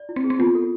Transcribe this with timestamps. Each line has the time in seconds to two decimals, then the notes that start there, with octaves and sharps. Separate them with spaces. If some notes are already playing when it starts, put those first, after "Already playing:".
Already playing: D5
0.09 E4
0.16 C4
0.24 G#4
0.30 C4
0.39 B3 F4
0.55 A4